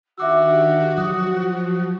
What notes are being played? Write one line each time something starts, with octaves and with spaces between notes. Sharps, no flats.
D#3 D4 F#4 G4 E5 D6 E6
F3 F#3 D#6